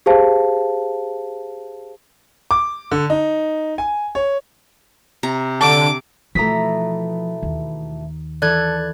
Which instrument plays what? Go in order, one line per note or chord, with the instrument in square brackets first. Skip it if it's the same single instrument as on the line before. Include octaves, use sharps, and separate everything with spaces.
[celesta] G4 G#4 C5 F5 A5
[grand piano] D6
D3
D#4
G#5
C#5
[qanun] C3 A#5
[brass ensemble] D3 [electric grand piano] A5 [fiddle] D6
[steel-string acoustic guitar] B2 E3 A3 [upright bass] F3 [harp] A#5 D#6 B6
[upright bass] D#2
[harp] E3 [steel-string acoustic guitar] A4 [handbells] D5 F#6 G#6